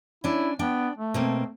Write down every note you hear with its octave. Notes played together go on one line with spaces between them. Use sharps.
C#4 D4 E4
B3 D4 G5
A3
B2 A#3 C4